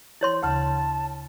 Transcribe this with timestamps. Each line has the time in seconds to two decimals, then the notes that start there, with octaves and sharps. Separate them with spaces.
0.21 E4 C#5 C6
0.43 D2 C#3 A5